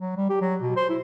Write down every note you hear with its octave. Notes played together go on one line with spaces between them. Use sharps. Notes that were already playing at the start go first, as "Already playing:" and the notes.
F#3
G3
G4
F#3
B2
C5
E4